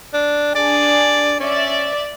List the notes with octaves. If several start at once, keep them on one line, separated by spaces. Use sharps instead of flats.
D4
D4 G#4 D5
C#4 D5 E5